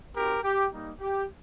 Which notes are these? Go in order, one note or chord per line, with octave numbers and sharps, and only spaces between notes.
C4 D#4 F#4 G4 A#4
G4
G3 A#3 D#4
G4